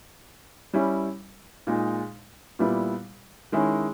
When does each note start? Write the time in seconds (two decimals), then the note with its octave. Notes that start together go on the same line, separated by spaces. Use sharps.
0.73 G3 C#4 E4
1.67 A#2 G#3 D#4
2.59 A#2 G3 B3 E4
3.52 D#3 G#3 C#4 E4